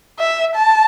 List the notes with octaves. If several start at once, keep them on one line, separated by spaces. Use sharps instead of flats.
E5
A5